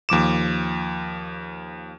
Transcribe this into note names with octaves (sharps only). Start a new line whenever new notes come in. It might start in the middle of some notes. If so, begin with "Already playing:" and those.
D#2 F3 D6 E7